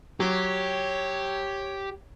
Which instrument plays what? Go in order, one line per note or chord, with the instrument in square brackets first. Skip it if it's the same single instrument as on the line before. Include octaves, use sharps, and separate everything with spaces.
[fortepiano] F#3 [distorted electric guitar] G4 [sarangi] C#5